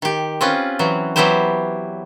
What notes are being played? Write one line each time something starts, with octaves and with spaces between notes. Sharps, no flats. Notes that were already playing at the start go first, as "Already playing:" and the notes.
D#3 G4
C4 C#4 F4 B4
E3 F#3
E3 F#3 B3 E4 G4 C5